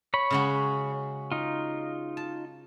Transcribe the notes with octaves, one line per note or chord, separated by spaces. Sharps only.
C#5 B5
C#3 G#3 F#4
D#4 F4
A5